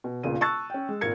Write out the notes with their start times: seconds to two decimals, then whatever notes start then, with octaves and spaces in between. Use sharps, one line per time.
0.04 B2
0.23 E1 C#2 A#2 C#3 D#7
0.41 A5 C#6 E6 F#6 A6
0.70 C#4 G5
0.89 G#3
1.01 G#1 A#2 A#4 G#6 C#7